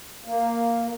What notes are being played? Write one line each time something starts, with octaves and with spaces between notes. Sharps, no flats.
A#3